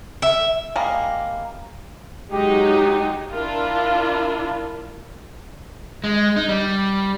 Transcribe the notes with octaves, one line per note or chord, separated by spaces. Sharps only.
E5
G3 G#3 A#3
F#3 G#3 D#4 G4
D4 E4 F4 A#4
G#3
D#4
G3